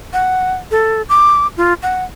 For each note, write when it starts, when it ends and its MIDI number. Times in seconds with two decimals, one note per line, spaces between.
0.13 0.55 78
0.71 1.02 69
1.09 1.47 86
1.57 1.74 65
1.83 2.04 78